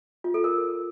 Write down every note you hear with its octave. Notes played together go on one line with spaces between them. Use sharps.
F4
A4
A#4